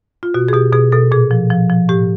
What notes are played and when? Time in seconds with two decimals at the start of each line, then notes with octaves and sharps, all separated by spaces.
0.23 F4
0.34 B2 F#4
0.48 G#4
0.53 B2 G4
0.73 B2 G#4
0.92 B2 A4
1.12 A#2 G#4
1.31 F3
1.50 F3
1.70 F3
1.89 A2 G4